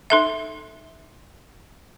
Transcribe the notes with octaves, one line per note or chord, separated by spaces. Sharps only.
D#4 A4 E5